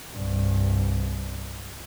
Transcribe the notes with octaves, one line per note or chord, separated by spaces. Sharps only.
C2 G2